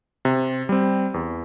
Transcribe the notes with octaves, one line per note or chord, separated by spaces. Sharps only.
C3
G3 C4
E2